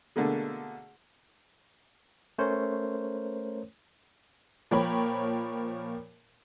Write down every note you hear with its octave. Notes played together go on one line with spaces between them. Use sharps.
B2 D3 A3 A#3 G#4
A3 C#4 A#4 C5 C#5
A#2 F3 A#4 C#5 G5 B5